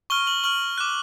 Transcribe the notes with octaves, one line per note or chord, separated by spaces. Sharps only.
C#6 F6 G7
F#7
C#6 F6 F#7
D6 F#6